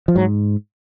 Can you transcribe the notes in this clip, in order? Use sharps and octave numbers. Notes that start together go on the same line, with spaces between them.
F3
G#2 F#3